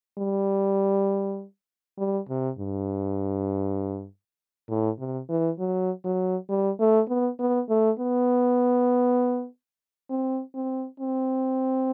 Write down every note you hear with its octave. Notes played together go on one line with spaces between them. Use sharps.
G3
G3
C3
G2
A2
C3
E3
F#3
F#3
G3
A3
B3
B3
A3
B3
C4
C4
C4